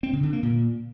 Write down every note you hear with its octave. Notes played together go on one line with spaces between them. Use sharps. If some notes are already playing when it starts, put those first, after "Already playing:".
C4
C#3
D3
A#3
A#2